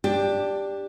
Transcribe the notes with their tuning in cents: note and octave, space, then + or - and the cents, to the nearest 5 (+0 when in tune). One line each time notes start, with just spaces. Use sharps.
D4 +0 G4 +15